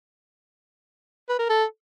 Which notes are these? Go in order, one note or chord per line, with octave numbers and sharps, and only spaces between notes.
B4
A#4
A4